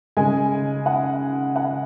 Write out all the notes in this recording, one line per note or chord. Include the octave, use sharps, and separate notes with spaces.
C#3 G#3 G#5
F#5
F#5